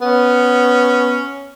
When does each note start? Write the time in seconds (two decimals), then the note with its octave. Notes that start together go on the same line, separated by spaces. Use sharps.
0.01 B3 C#4